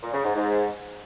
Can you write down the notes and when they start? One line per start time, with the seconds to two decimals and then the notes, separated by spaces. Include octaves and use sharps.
0.02 A#2
0.13 C#3
0.24 G#2
0.35 G#2